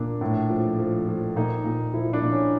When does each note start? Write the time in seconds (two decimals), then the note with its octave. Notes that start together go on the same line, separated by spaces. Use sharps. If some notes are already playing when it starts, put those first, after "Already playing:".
Already playing: A#2 D4
0.21 A2
0.50 F3
0.79 F3
1.08 F3
1.36 A#2 D#4
1.65 A#2
1.94 F3 E4
2.13 D4
2.23 A#2
2.32 C#4